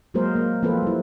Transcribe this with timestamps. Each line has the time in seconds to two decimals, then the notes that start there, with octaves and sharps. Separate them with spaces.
0.14 F#3 G#3 A#3 G#4 A#4 C5
0.35 A#3
0.63 F3 A#3 C4 F4 A4 B4
0.83 G3 E4